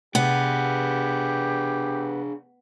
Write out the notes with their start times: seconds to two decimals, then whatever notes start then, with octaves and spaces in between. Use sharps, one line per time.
0.15 C3 B3 D4 G4 G#4